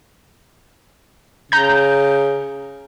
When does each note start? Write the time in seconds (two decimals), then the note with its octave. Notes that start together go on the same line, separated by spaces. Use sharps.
1.52 C#3 A#5 G6